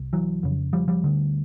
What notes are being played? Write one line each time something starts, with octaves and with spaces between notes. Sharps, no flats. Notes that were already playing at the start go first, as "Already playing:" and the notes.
Already playing: C2
E3 F#3
F2 C#3
F3 G3
F3 G3
D2 D3